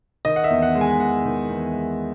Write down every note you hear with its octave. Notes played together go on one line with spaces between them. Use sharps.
D#3 D#5
F#5
E5
E2
F#5
G#3
G#5
E2 F#5
D#3
E2
G#3